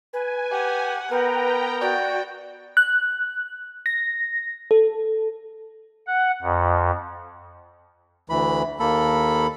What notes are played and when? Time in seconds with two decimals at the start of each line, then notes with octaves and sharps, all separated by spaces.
0.13 B4 G#5
0.52 G4 F#5
1.11 B3 A#4 B4 G5 A#5
1.81 F#4 D5 G5
2.77 F#6
3.86 A#6
4.71 A4
6.07 F#5
6.42 F2
8.30 D2 E3 B5
8.80 D#2 A#3 A4 B5